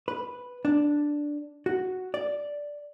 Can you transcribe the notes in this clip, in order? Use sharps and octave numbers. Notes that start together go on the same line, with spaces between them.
B4
D4
F#4
D5